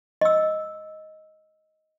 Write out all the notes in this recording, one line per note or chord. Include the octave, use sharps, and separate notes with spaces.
D#5 E6